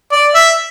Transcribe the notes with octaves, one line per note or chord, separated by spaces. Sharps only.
D5
E5